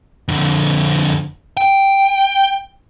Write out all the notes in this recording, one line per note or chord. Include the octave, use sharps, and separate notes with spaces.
F2 D3
G5